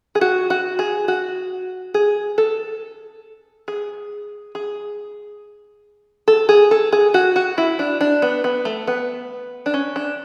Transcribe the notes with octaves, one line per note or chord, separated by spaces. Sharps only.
G#4
F#4
F#4
G#4
F#4
G#4
A4
G#4
G#4
A4
G#4
A4
G#4
F#4
F#4
E4
D4
D4
B3
B3
A3
B3
D4
C#4
D4